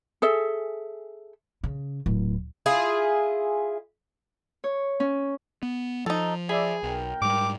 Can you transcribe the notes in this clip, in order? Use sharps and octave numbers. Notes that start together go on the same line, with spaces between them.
G#4 A4 E5
C#3
D1
E4 F4 G#4
C#5
C#4
B3
F3 D#4 A4
G#4 D5 E5 B5
B1 A#4 G5
G#2 G3 D6